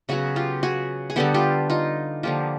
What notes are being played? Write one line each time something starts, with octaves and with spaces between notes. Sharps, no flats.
C#3 F#3 B3 F#4 G#4
F4 G4
F#4 G#4
G#4
D3 G3 B3 G4 A4
F4 G4
D#4 F4
D3 F3 A#3 F4 G4